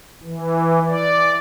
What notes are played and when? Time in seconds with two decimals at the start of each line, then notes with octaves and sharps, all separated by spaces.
0.24 E3
0.88 D5